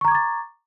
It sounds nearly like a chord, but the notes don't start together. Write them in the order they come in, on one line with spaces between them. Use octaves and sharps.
C#6 A#5 G#6 D6 A6